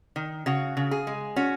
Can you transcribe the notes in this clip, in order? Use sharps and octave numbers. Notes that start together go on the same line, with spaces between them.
D#3
C#3 F#4
C#3
G#4
G#3
C#4 F#4